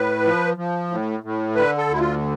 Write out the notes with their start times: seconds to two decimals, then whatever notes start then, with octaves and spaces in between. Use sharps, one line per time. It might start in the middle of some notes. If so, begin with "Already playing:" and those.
Already playing: A2 B4
0.24 F3
0.57 F3
0.90 A2
1.23 A2
1.55 D3 B4
1.77 A4
1.89 D2 E4
1.99 F4